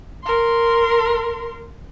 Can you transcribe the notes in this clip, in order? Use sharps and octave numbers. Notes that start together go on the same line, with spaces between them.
A#4 C6